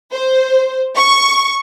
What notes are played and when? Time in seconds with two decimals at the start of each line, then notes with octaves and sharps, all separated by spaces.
0.12 C5
0.96 C#6